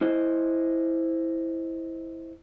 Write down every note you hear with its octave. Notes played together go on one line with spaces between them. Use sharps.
E4 C5 D#5